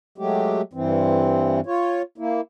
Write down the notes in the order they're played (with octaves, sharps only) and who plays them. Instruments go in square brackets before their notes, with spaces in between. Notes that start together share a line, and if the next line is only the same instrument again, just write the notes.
[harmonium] F#3 G#3 A3 G4
G2 E3 C4
F4 C#5
A#3 E4